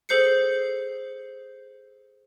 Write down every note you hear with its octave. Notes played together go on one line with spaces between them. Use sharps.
G#4 A4 C5 G6 C7 C#7